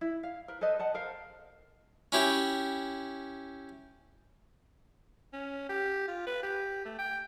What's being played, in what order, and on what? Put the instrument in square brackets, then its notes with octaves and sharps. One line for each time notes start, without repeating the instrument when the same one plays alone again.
[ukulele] E4
F5
A#4 B4
A4 B4 C5 D#5
D#5 F#5 A5
A4 A#4 C5 F5
[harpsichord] C#4 E4 G4
[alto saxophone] C#4
G4
F4
B4
G4
A3
G5